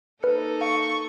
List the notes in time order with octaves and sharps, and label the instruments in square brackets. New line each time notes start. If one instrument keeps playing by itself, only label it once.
[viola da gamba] A#3 D#4 A4 [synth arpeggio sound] B4 F6 C#7
[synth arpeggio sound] F5 [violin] C#6